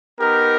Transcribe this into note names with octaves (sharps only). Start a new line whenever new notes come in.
B3 D#4 G4 A#4